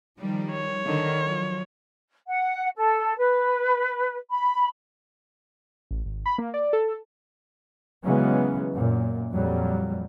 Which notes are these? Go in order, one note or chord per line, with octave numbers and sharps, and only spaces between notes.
D#3 F3 G3
C#5
D3 D#3
F3 F#3
F#5
A4
B4
B5
A1
G#1
B5
A#3
D5
A4
C#3 E3 F#3 G#3 B3 C#4
F#2 A#2
F2 A#2 F#3 G3